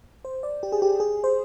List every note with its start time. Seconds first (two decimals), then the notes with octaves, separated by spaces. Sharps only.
0.25 C5
0.43 D5
0.63 G4
0.72 G#4
0.82 G4
1.00 G#4
1.24 C5